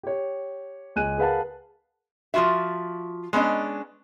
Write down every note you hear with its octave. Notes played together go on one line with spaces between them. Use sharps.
G4 C#5
C#2 G#5 F#6 D#7
G#4 A#4 B4 F5 F#5 A5
F3 B3 F4 F#4 E5
G#3 B3 C#4 D4 D#5